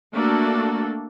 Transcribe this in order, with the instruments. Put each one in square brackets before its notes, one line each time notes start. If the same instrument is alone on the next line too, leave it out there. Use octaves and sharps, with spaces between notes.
[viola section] A3 A#3 D4 F#4 A4